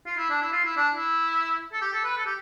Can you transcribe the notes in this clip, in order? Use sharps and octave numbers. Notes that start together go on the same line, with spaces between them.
F4
E4
D4
E4
F4
E4
D4
E4
A4
G4
A4
B4
A4
G4